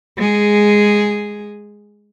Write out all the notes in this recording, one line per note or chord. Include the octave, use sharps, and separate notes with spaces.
G#3 G#4